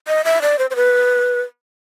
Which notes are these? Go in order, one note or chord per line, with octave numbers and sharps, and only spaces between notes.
D#5
E5
D5
C5
C5
B4